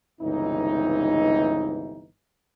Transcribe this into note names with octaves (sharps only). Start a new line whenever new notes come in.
G1 C#2 C3 E3 D#4